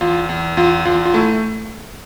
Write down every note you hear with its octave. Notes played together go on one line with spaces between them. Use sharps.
E2 F4
E2
E2 F4
E2 F4
F4
A3 E4